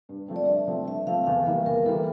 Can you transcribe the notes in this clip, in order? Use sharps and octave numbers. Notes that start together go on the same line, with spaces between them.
G2
F3 A3 C4
D5
G2 E5
F3 A3 C4
G2 E5
F3 A3 C4 F5
E2 F5
E3 G3 A#3 E4
E2 A#4
E3 G3 A#3 E4 A4